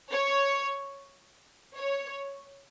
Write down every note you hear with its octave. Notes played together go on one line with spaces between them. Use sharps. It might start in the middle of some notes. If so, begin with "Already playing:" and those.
C#5
C#5